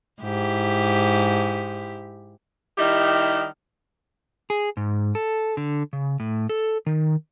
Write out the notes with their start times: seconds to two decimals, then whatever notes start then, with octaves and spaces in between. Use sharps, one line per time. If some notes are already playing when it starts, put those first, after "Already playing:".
0.22 G#2 E4 G4
2.78 D#3 G3 D#4 E4 G4
4.50 G#4
4.77 G#2
5.15 A4
5.57 D3
5.93 C#3
6.20 A2
6.49 A4
6.86 D#3